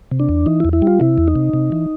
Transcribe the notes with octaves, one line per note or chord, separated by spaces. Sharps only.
C3
D4
E2
E3 D#4
E4
E2
E4
G3 F4
C3 E4
E2
D#4
C3
C3
E3